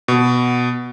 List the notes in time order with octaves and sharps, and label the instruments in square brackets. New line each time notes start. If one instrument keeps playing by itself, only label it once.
[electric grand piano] B2